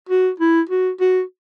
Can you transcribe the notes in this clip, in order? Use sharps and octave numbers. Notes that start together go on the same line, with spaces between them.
F#4
E4
F#4
F#4